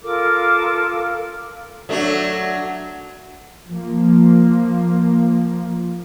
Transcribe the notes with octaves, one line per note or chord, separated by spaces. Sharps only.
F4 A4 A#4 D6
F#3 A3 D4
F3 A#3